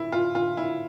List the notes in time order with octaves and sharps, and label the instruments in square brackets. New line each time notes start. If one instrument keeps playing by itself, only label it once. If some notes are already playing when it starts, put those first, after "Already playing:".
Already playing: [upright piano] E4
F4
F4
E4